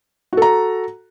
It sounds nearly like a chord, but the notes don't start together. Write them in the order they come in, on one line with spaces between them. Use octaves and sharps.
F#4 A4 A#5